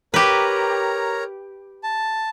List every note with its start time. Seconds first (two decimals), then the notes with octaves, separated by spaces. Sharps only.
0.14 G4 A#4 B4 C#5 A#5
1.83 A5